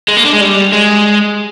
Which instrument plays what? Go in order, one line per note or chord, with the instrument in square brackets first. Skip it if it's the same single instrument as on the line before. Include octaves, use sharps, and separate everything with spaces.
[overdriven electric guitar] G#3
A#3
D4
G#3
G3
G#3